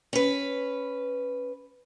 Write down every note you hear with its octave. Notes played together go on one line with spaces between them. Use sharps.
C#4 B4